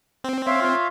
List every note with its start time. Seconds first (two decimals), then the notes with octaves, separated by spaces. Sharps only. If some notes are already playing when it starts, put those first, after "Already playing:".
0.24 C4
0.46 C#5 E5 F5 C6
0.61 F4